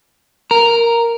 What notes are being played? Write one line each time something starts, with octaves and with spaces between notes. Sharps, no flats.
A#4